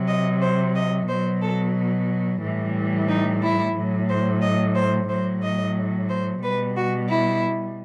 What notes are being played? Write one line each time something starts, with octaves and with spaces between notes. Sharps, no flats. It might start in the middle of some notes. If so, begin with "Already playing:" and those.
Already playing: C3 F#3
D#5
C5
D#5
B2 F#3 C5
A4
A2 E3 G3
D#4
E4
A2 F#3
C5
D#5
C5
A2 F#3 C5
D#5
C5
B2 G3 B4
F#4
E4